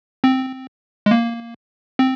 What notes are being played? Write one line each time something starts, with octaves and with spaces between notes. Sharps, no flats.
C4
G#3
A#3
C4